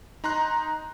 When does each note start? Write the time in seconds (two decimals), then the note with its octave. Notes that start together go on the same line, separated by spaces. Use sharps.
0.24 D#4 A#5 C6 F#6